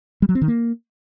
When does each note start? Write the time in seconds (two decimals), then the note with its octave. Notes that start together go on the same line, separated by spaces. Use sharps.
0.22 G3
0.29 F#3
0.35 C4
0.42 D#3
0.48 A#3